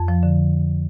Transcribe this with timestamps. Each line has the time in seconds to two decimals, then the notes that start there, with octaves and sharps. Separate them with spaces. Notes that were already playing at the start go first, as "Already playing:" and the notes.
Already playing: F2
0.08 F3
0.23 D3